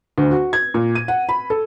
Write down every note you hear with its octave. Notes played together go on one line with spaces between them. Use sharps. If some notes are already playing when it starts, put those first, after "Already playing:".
D2
F#4
G#6
A#2
D#7
F#5
B5
A4